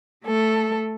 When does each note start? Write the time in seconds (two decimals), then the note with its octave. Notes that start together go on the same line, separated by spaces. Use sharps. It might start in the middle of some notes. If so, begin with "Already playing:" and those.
0.25 A3 A4